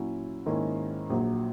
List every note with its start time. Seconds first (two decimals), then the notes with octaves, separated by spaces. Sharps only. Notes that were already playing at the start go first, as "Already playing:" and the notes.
Already playing: A#2 F#3 C#4 E4
0.46 G#2 D#3 A#3 C#4 E4
1.10 A#1 A#2 F#3